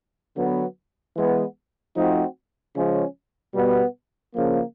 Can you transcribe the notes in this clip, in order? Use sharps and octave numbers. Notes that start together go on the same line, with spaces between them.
D3 F#3 B3
E3 G#3 B3
F3 A3 C4 D#4 F#4
C#3 F3 G#3 C#4
B2 G3 B3
C#3 F3 A#3